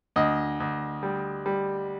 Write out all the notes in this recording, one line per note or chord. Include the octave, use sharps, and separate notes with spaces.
D2 D#5
D2
G3
G3